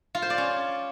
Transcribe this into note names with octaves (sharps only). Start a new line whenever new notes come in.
F4
C5
D5
C#4